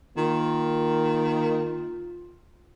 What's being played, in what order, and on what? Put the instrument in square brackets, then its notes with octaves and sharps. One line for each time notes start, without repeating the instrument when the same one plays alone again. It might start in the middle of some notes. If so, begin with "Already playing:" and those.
[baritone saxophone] D#3 [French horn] A#3 [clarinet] F4